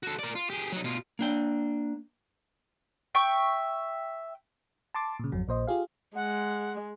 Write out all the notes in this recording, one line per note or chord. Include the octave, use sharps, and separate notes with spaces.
F#4 A4
A#4 D5
F4
G4 G#4
F#3 D#4
B2 F4
A#3 D4 G5
E5 G5 C#6
A5 C6 D6 A6
A#2 C#3
G#1 F2 F#3
A#1 A#2 C5 D#5
F4 G4 G#4 F5
G#3 F#5